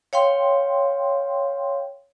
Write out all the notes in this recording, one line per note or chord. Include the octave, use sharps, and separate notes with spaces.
C#5 F5 G5 C6